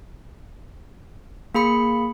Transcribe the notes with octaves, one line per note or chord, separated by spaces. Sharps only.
A#3 G#4 B5 C#7